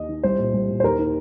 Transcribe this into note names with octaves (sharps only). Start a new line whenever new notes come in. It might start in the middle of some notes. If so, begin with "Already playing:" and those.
Already playing: D#2 D#5
D#3
C2 C5
A#2
C2
A#2
C5
D#2 A#4
D#3